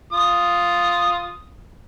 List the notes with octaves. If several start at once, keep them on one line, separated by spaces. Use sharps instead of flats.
F4 D#6